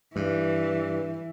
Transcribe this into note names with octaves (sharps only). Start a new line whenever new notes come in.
G2 E3